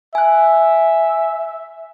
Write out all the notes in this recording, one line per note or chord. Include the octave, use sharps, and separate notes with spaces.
E5 G#5 F#6